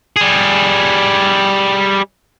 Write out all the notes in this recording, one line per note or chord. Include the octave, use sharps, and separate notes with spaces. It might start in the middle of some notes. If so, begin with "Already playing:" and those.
G3 G#4